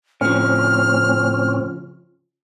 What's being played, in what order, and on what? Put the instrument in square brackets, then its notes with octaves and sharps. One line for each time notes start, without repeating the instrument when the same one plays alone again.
[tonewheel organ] A2 C4 C#4 [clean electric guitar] C#3 F3 [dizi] F6